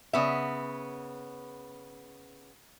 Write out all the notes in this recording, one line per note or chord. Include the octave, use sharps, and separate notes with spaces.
C#3 B3 E5